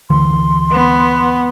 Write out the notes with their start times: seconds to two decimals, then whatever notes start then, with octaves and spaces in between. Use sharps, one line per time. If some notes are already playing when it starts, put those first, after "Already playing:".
0.10 D2 D3 E3 C6
0.72 B3